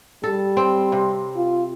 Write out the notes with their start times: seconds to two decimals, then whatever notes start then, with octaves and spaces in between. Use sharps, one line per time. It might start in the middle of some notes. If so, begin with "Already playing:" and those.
0.24 G3 A4
0.57 C4
0.92 C3
1.37 F4